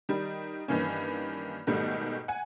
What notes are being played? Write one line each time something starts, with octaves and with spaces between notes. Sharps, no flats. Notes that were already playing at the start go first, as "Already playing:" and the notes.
D#3 G3
G2 D#3 E3 A#3 C#4
G#2 B2 D#3 G3 A3
F#5 G#5